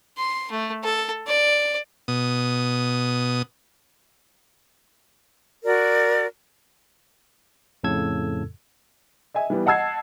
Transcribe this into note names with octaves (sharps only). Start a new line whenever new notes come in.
C6
A3
A4
D5
B2 D#6
F#4 A#4 D5
F2 A2 C#3 A4 E6 G#6
D#5 E5 G#5
E3 G3 B3
D#5 F#5 A5 E6 G#6 C7